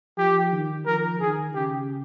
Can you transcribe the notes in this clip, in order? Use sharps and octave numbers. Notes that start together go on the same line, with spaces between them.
F3 G4
D#3
F3 A#4
D#3 G#4
C#3 G4